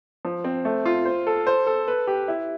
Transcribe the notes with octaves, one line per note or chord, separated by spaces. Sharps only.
F3
C4
A3
F4
C5
A4
C5
A4
B4
G4
E4